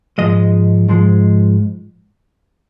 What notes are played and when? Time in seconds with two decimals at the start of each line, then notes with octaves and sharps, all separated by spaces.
0.18 G#2 F3 G#3 D#5
0.89 G#2 F3 G#3